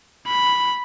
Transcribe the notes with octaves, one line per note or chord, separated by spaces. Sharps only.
B5